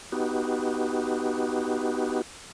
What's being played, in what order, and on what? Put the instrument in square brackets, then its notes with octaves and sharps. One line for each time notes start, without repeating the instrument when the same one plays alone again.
[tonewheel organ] B3 D#4 F#4 G4